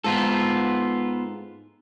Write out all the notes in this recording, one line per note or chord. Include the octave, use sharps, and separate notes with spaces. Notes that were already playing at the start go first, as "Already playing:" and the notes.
G#2 B3 F4 A4